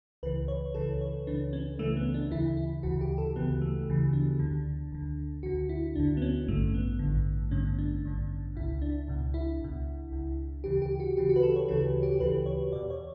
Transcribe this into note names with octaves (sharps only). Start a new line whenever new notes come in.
C#2 C#3 E3 B4
C#5
C#2 C#3 E3 A4
C#5
C#2 C#3 E3 D4
C#4
C#2 C#3 E3 A3
B3
D4
D2 C#3 E3 E4
E4
D2 C#3 E3 F#4
G4
A4
D2 C#3 E3 B3
A3
D2 C#3 E3
D4
D2 D3
D2 D3
D2 D3 F#4
E4
D2 D3 D4
B3
C#4
A1 G2 D3 A3
B3
A1 G2 D3
A1 G2 D3 C#4
D4
A1 G2 D3
C#2 B2 E4
D4
C#2 B2
E4
C#2 B2
C#2 B2
D2 C#3 E3 G4
G4
F#4
D2 C#3 E3 G4
F#4
B4
A4
C#5
D2 C#3 E3 A4
G4
D2 C#3 E3 B4
C#5
E2 B2 D5
C#5